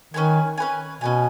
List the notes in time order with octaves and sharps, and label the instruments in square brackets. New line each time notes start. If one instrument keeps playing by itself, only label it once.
[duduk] D#3 [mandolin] C#4 B4 G#5
[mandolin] C#4 B4 G#5
[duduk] B2 [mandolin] C#4 B4 G#5